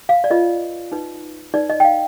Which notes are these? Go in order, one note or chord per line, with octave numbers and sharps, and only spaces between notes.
F5
D5
F4 B4 D#5
D#4 B4
D#4 B4 D5
D#5
G5
F5